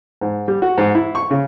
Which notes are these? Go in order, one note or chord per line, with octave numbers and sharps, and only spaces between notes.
G#2
G3
F#4
G#2
E4
C#6
C#3